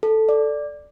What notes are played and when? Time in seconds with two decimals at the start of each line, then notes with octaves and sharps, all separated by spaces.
0.03 A4
0.29 D5